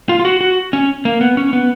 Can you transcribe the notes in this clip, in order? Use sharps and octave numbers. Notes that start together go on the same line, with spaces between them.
F4
F4
F#4
F#4
C#4
A#3
B3
C#4
B3